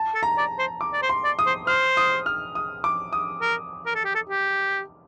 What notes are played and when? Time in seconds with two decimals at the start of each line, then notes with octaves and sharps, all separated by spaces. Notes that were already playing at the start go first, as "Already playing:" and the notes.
Already playing: A5
0.15 A4
0.23 A#5
0.38 D5
0.59 C5
0.81 D6
0.93 D5
1.02 C5
1.09 C6
1.24 D5
1.39 D#6
1.46 C5
1.67 C5 F6
1.97 D#6
2.26 F6
2.55 D#6
2.84 D6
3.13 D#6
3.42 A#4
3.86 A#4
3.95 A4
4.04 G4
4.15 A4
4.29 G4